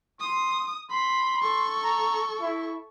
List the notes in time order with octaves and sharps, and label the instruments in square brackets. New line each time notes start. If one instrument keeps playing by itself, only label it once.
[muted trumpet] C6 [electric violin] D#6
[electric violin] B5 [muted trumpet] C6
[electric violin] A4 C#6
[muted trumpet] A#5
E4